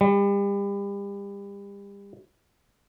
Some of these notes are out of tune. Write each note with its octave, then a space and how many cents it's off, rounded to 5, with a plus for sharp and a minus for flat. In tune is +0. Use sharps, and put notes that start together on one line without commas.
G3 +35